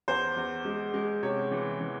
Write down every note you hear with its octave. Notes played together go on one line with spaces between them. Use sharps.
E2 C5
E2
G#3
G#3
C3 C#5
E3
E3